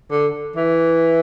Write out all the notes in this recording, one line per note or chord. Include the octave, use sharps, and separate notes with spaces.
D3
E3